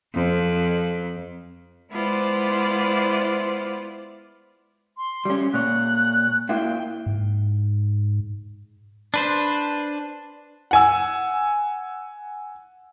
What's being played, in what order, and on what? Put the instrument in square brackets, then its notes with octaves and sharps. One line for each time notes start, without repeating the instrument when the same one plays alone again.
[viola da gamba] F2
[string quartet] G#3 B3 E4 F4 C5 D5
[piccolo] C6
[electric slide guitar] G3 C#4
[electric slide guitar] A#2 C#5 [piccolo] F#6
[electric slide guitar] A#3 E4 F4 [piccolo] G5
[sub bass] G#2
[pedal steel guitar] D4 B4 C5
[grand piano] F#5 G#5 E6